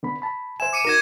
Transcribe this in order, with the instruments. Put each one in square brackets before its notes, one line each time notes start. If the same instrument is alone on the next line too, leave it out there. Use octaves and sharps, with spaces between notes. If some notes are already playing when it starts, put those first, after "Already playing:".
[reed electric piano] D3 B3 B5
A5 B5
[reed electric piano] C5 E5 G#5 [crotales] E7
[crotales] D6 C#7 D#7
[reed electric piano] D#4 F#4 A#4 [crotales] G#6 A#6 E7